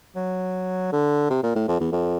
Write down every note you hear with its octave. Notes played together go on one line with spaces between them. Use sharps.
F#3
D3
C3
A#2
A2
F2
E2
F2